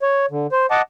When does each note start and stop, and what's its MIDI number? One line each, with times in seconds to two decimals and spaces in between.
0.02 0.26 73
0.31 0.47 50
0.52 0.66 72
0.71 0.82 75
0.71 0.82 78
0.71 0.82 81
0.71 0.82 86